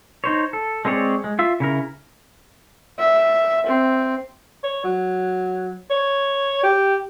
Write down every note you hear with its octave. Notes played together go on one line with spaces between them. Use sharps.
D#4 C5 C#5
A4
G#3 C4 G#4 C#5 D5
G#3
F4 E5
C#3 E4 A#4
E5
C4
C#5
F#3
C#5
G4